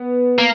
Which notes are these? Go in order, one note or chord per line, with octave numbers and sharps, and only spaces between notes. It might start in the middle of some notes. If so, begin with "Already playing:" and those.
Already playing: B3
A#3